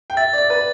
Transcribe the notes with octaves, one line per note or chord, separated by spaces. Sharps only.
G5
E5 A6
D5
A6
B4